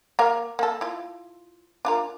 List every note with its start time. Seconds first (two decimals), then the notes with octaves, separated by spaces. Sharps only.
0.19 A#3 A#4 F5
0.59 A#3 A4
0.81 E4 F4
1.85 D4 F4 A#4